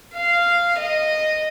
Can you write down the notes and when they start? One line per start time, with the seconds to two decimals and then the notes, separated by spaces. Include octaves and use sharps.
0.15 F5
0.78 D#5